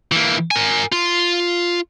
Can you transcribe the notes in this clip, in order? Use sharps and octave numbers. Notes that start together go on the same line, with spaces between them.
E3 A#3
A#4 G#5
F4